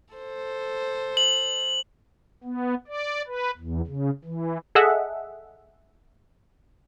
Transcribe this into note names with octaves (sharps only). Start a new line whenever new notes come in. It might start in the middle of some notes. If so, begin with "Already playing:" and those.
A4 C5
F#7
B3
D5
B4
E2
C#3
E3
G#4 A4 D#5 E5 F#5